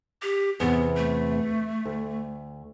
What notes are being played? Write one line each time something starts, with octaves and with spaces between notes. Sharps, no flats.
G4
E2 C3 E3 B3
A3
D2